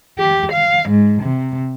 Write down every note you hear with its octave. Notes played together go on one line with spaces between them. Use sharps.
G4
F5
G#2
C3